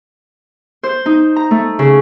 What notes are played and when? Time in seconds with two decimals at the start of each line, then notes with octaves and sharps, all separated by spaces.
0.83 C5
1.06 D#4
1.36 A#5
1.51 A3
1.79 C#3